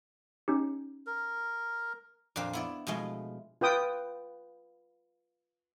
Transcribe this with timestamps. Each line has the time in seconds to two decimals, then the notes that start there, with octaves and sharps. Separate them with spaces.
0.48 C#4 D#4 G4
1.07 A#4
2.36 F2 A#2 D4 F4 C5
2.53 B3 E4 D5
2.87 B2 F3 G#3 A3
3.61 F4 B4 G5 D#6